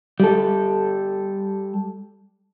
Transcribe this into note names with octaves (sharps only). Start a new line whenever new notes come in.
G3 A4